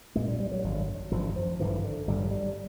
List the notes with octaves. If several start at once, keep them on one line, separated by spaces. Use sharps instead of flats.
B1 A#2 G#3
G3
G3
F#3
G#1 F#2 D3
G#1 F#2 D3 F3
F3
G#1 G2 D3 E3
D3
G#1 G2 D3 G3
F#3
G3